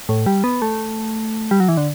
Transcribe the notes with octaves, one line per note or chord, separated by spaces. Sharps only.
A2
G3
B3
A3
G3
F#3
E3
D3